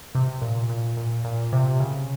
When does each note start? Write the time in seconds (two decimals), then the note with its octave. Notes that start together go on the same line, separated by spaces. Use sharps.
0.15 C3
0.42 A#2
0.70 A#2
0.97 A#2
1.24 A#2
1.53 C3
1.80 C#3